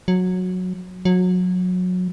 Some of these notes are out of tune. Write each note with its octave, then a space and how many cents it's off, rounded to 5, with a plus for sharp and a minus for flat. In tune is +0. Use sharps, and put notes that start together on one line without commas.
F#3 -15
F#3 -25